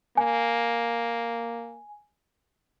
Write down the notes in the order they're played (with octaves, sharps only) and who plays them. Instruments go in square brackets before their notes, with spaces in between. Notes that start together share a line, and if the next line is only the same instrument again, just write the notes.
[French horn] A#3 [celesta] G#5